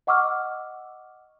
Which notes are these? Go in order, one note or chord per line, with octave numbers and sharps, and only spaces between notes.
D#5 F#5 C#6 D6 E6 F6